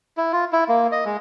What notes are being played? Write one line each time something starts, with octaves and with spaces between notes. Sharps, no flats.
E4
F4
E4
A#3
D#5
G#3